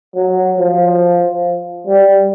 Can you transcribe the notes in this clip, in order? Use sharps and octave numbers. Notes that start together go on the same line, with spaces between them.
F#3
F3
G3